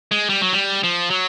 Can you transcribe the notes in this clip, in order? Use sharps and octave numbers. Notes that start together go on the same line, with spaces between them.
G#3
G3
F#3
G3
F3
F#3